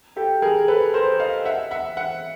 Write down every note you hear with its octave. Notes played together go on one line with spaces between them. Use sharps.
G4 A4
G#4 A#4
A4 B4
A#4 C5
D#5 F5
E5 F#5
E5 F#5
E5 F#5